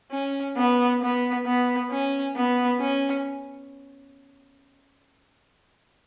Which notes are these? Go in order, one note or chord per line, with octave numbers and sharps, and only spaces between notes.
C#4
B3
B3
B3
C#4
B3
C#4